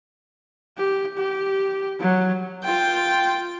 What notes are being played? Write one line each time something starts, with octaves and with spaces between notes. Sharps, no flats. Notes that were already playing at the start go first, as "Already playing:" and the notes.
G4
G4
F#3
F4 G5